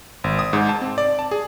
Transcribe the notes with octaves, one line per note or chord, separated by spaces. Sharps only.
G#1
D#6
G#2
A5
C4
D5
A5
G#4